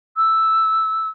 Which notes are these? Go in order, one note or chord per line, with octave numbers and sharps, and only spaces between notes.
E6